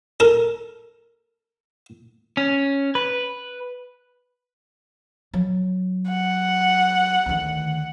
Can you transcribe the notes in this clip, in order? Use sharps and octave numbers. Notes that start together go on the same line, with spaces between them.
A4 A#4
C#4
B4
F#3
F#5
D2 D#3